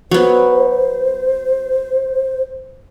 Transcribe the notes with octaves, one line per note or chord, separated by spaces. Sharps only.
F#3 B3 C5